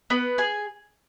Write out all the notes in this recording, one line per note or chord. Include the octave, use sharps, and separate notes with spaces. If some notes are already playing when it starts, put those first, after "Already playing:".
B3 B4
G#4 G#5